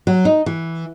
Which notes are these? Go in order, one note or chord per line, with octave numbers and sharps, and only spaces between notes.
F#3
D#4
E3